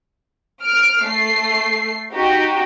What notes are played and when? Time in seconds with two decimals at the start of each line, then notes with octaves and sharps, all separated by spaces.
0.63 F6 D7
1.04 A3 C7
2.13 D#4 F#4 G4